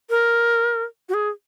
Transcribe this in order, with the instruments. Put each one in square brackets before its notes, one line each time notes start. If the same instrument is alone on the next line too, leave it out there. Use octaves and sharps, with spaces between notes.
[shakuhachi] A#4
F#4
G#4